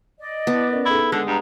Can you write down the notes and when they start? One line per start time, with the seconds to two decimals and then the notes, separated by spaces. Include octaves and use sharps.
0.19 D5 D#5
0.47 B3 E4 A5 D6
0.69 C#4 A#4
0.86 D#4 E4 G#4 A4
1.12 D3 G#3 F#5 A5
1.27 G2 A#5